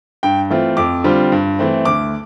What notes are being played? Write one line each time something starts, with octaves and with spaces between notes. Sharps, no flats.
G2 G5
E3 A3 C4 F4
F2 D6
D3 G3 C4 F4
G2
E3 A3 C4
D2 D6